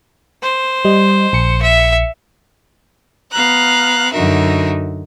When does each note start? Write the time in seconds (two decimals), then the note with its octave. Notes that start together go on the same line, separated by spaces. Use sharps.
0.42 C5
0.85 G3 D#5
1.33 A#1 C#7
1.62 E5
3.32 B3 F5 A#5 F#6
4.13 F#2 D3 D#4 F#4 A#4 E5